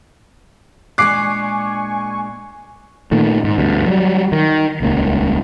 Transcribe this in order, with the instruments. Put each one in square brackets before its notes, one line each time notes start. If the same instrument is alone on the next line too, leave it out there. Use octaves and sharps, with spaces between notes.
[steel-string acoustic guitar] A#2 G#3 D4 [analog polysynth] G#5 C#6 [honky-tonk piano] D6 [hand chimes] F#6 C7
[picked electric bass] A#2 D#3 A3
G#2
D2 G2
F#3 G3
D#3
D#1 C#2 A#3